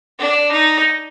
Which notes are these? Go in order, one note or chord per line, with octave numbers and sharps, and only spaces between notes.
D4
D#4